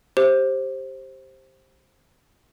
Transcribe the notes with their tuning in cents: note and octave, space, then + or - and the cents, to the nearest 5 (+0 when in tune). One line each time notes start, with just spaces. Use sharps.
G4 +0 C5 +15